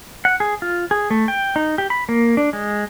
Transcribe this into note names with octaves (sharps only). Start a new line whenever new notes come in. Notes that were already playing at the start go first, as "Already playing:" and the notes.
F#5
G#4
F4
G#4
A3
G5
D#4
G4
B5
A#3
D4
G#3